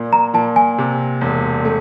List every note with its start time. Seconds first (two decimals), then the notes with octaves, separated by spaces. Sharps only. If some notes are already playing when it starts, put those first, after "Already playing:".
Already playing: A#2
0.13 A#5
0.34 A#2 A5
0.56 G#5
0.78 C3
1.21 E1
1.65 A3